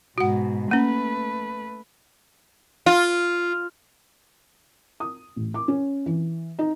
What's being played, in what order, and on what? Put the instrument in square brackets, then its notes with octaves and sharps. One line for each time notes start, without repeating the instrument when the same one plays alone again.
[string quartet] G#2 B2 [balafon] F#4 F#5
[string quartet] A3 B4 [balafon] A#3 C#4
[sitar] F4
[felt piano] D#6
A1
D6
C#4
E3
D#4